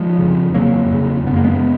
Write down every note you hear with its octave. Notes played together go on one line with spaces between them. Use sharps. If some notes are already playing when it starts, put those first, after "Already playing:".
Already playing: F3 G#3
F2 C#3
F2 C#3 F#3 A#3
F2 C#3
F#2 C#3 B3
A#3
G#3 B3